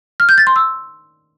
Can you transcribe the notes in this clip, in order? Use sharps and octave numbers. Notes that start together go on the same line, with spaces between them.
F6
G6
A6
C6
E6